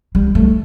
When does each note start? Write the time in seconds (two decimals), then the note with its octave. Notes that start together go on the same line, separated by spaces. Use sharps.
0.15 G3
0.35 A3